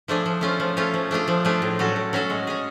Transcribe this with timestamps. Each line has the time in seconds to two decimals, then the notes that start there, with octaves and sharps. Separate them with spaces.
0.08 F3 A3 D4 G#4
0.26 F3
0.41 A3 C#4 F4
0.60 F3
0.77 A3 C#4 F4
0.94 F3
1.11 A3 D4 F4 G#4
1.28 F3
1.45 A3 D4 F4 G#4
1.62 A2
1.79 F#3 C#4 F#4 A4
1.96 A2
2.13 F#3 C#4 F#4 A4
2.30 G#3
2.47 C#4 G#4